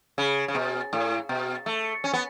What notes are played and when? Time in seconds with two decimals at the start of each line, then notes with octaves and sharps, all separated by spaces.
0.18 C#3
0.48 C#3
0.55 B2
0.93 A2
1.29 B2
1.66 A3
2.04 C#4
2.13 B3